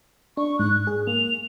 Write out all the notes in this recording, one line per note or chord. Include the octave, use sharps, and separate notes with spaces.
D4 C#6
G#2 F#6
G#4
A#3 F7